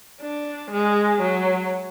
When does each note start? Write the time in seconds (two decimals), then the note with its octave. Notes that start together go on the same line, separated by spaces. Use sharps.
0.21 D4
0.71 G#3
1.21 F#3